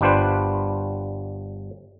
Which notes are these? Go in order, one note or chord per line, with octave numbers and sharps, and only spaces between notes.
G1 G3 D4 F4 B4 C5